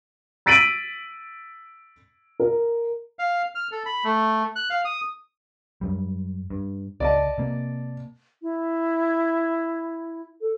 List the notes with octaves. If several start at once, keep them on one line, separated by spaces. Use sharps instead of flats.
E6 A6 B6 D7 D#7 F#7
A#4
F5
F6
A4
B5
A3
F#6
F5
D#6
F#2 G3
G2
C#2 D5 D#5 A5
C3 A#3
E4
A4